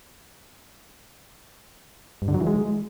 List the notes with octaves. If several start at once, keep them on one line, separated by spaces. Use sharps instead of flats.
G2
D3
F#3
E3
G#3